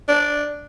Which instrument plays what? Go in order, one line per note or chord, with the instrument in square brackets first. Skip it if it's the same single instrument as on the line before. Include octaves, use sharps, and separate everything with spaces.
[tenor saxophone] D4